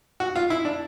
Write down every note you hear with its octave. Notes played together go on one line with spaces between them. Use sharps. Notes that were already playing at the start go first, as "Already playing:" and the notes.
F#4
F4
E4
D4